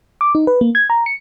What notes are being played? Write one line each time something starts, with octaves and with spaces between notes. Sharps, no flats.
D6
D#4
B4
A#3
G#6
A#5
C#7